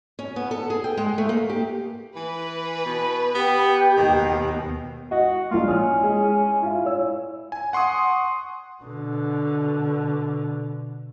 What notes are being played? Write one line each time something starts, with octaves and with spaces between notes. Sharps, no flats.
C#4
B3
A4
G#4
G5
G#3
A3
A#3
G4
E3 B4
B2
B3 G4
D#2 B2 D#3
F#4 D#5
A#1 A#3 F4
C#4 D#6 F6
G#3 G#4
E4 F4
C#5 E6
G#5
F#5 C6 C#6 D#6
B2 D3